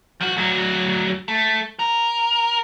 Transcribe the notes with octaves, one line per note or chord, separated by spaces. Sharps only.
F3 F#4
D2 F#3
A3
A#4